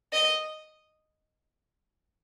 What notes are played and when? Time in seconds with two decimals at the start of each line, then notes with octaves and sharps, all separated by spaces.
0.13 D#5